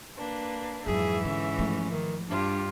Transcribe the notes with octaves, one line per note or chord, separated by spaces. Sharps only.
A#3 D4 B4
F2 G#2 E3 F#3 G#4 E5
D3 C#4
F3 A3
D#3
G2 D4 F4 G4